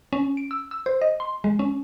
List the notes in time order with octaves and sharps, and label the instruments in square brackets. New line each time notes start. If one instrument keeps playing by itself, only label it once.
[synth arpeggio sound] C#4
D7
E6
E6
C5
D#5
C6
G#3
C#4